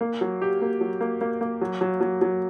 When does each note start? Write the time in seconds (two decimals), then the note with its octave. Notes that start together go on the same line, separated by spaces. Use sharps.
0.01 A#3
0.21 F#3
0.42 G4
0.62 A#3
0.81 F#3
1.01 A#3
1.21 A#3
1.41 A#3
1.61 F#3
1.81 F#3
2.01 F#3
2.21 F#3